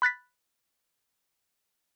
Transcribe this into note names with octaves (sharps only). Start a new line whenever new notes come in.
B5 F#6 A6 B6